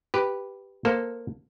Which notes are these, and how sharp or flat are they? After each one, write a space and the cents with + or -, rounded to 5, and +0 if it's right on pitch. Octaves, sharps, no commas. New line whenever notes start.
G4 +0 B4 +0
A#3 +0 A4 +15 C5 +0